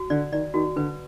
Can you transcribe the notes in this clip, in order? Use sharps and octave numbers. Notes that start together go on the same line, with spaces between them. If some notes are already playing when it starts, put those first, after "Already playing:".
Already playing: F#4
D3 D5
D#3 D5
D#3 F#4
D3 B4